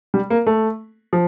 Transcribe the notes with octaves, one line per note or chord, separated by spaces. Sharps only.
G3
A#3
A3
F3